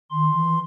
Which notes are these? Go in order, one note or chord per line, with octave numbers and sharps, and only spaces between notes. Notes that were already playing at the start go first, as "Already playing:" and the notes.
D#3 C6
E3